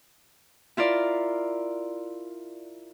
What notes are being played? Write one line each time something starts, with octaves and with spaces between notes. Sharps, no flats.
E4 F4 A#4 D5